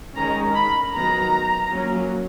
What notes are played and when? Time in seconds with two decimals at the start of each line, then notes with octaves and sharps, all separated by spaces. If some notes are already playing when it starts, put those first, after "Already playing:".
0.18 D#3 G#3 C#4 A#5
0.55 B5
0.93 D#3 F#3 B3 A#5
1.70 F#3 A#3 C#4